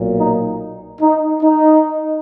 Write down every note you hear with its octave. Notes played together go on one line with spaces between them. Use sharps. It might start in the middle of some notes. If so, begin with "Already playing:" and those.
Already playing: B1 A#2 F#3
D#4
D#4
D#4